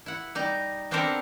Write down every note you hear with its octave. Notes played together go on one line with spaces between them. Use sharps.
E4 F#5
G3 D#4
B3 C4 D4 A4 A#4 C5